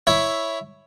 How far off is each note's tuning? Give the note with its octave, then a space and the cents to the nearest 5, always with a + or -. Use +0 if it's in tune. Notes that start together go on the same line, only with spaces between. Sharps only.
E4 +0 C#5 +0